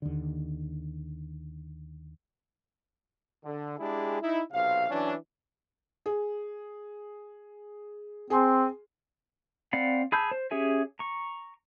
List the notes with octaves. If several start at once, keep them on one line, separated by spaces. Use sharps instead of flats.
D#2 D3
D3
G#3 D4 E4 G4 G#4
D#4 E4
B1 C3 F5
E3 F#3 C#4 D4
G#4
C4 G#4 G#5 C6
C4 D5 F5 F#5 B5
G#4 A5 B5 E6 G6
C5
C#4 G4 G#4 E5 G#5
A#5 C#6